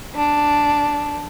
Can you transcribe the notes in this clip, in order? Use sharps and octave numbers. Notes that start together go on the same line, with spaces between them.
D4